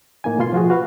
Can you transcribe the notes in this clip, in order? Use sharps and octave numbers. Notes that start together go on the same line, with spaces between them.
A2 A#3 D#4 G#5
B2 A3 F4 C6
F3 F4 F#4 G#4
F#4 B4 F5